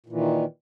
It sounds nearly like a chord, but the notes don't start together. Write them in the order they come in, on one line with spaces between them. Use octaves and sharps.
A#2 E3 D#3